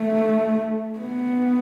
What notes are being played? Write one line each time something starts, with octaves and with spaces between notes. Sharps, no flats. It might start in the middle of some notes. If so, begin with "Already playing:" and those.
Already playing: A3
B3